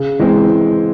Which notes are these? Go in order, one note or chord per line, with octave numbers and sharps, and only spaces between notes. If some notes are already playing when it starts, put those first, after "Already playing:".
Already playing: C#3
E3 G#3 C4